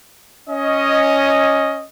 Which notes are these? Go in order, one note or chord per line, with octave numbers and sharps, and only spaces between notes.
C#4 D#5